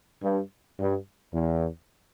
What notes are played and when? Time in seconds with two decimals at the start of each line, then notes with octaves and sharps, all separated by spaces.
0.23 G2
0.79 G2
1.33 E2